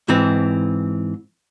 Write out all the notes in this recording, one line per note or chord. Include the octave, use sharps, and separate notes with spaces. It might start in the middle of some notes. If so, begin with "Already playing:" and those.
G#2 E3 C4